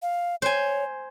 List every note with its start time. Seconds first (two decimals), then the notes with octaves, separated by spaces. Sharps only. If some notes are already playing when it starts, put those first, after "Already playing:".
0.02 F5
0.42 C5 C#5 G#5